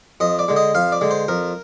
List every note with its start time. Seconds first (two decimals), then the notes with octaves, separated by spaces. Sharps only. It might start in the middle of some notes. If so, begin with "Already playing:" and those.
0.20 F2 D#5
0.39 D5
0.48 D3 G#3
0.56 D#5
0.75 F2 F5
0.92 D5
1.01 D3 G#3
1.11 C5
1.28 F2 A#4